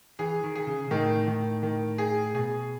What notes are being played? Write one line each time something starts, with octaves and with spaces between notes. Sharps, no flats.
E3 G#4
D#3
G#4
C#3
A2 D#3
D#3
D#3
G#4
B2 G#4